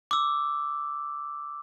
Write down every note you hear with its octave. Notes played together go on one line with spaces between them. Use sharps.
D6 E6